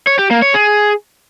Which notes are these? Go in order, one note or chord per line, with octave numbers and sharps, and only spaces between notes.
C#5
G4
A#3
C#5
G#4